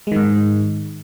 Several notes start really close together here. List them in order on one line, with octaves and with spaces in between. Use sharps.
G#3 D#3 G#2